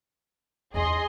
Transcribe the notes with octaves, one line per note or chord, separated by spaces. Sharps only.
E2 D#4 G#4 D#5 C6